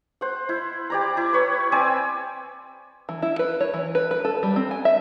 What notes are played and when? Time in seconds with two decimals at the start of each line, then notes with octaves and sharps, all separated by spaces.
0.21 C5 F#5
0.49 E4
0.90 G4 D5 A#5
1.17 E4
1.33 B4 C#5
1.72 C4 D5 G#5 E6
3.09 E3
3.22 E4
3.39 B4
3.61 C#5
3.74 E3
3.95 B4
4.11 B4
4.25 A4
4.43 G3
4.56 C4
4.71 G#5
4.85 E5